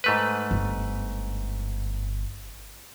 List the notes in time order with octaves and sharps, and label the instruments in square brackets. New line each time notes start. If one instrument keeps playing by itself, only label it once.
[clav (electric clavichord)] G#2 A3 B4
[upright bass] G1